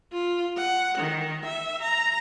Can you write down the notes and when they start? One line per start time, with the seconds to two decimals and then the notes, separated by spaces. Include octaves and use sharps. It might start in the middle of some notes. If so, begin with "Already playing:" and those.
0.13 F4
0.57 F#5
0.97 D#3
1.45 E5
1.82 A#5